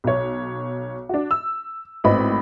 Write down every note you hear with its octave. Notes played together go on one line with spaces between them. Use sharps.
B1 C#5
D4 F#4
E6
G#1 A2 B3 C4 D#5 B5